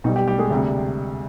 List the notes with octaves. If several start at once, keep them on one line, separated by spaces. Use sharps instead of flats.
B1 B2 G3 D#4
G3 G4
G3 G4
G#3 G#4
D2 C3 G3